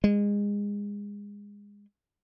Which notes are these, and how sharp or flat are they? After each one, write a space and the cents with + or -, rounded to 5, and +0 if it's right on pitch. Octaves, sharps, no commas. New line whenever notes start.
G#3 -25